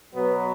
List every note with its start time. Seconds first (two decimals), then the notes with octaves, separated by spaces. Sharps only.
0.14 B2 F#3 B3